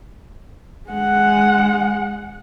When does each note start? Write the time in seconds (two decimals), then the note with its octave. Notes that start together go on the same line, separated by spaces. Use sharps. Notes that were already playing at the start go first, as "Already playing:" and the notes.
0.90 G#3 F#5